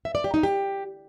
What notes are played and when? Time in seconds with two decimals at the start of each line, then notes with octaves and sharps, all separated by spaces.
0.05 E5
0.15 D5
0.24 G4
0.34 D#4
0.43 G4